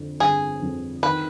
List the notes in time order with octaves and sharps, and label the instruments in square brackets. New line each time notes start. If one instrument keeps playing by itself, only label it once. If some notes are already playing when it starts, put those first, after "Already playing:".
Already playing: [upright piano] F2 D3
[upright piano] G1 [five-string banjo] G#4
[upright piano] F2
[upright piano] D#3 [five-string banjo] B4